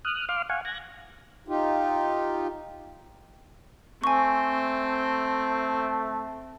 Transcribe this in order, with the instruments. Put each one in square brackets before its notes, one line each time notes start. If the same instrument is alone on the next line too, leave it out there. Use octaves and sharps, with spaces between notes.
[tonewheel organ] D#6 F6 F#6
F5 C6 D6 F6
F5 F#5 G#5 C#6
F#6 G#6 A#6
[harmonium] D#4 F4 G4
[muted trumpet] A3 [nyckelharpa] C4 [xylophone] G#5 C#6